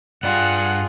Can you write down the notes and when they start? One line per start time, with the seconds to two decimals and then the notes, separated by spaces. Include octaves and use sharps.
0.23 G2 F4 G#4 D5 F#5 G5